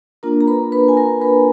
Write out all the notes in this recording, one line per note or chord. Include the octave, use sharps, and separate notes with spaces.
A#3 D4 F4 A#4 A#5
A#5
B4 B5
B4 B5
G#5
A#4 A#5
B4 B5